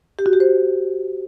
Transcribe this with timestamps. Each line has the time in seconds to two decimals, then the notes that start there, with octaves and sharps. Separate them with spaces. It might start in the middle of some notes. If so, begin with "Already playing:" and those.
0.19 G4
0.26 F#4
0.33 G4
0.40 C5